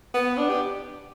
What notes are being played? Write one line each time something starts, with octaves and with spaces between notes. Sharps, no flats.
B3
D4
G4